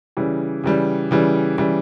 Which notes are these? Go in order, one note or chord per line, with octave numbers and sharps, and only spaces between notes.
C#3 E3 G3
C#3 E3 G3
C#3 E3 G3
C#3 E3 G3